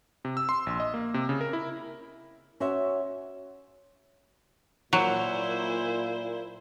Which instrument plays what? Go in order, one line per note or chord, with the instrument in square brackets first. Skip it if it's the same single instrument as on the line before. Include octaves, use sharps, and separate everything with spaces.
[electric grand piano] C3
E6
C6
A#1
D#5
A#3
C3
C#3
A#4
E4
[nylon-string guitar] C#4 F#4 C5 E5
[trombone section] A#2 [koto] F#3 [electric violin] E4 C5